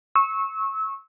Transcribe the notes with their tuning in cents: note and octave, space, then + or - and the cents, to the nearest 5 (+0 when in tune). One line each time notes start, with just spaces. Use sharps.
C#6 -20 E6 -25